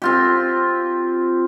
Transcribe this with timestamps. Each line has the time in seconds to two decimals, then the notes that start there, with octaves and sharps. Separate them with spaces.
0.02 C4 F4 G4